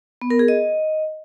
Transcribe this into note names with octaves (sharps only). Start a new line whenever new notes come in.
B3
A#4
G#4
D#5